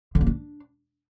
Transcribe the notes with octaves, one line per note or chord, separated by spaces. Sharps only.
D3
A#3
D4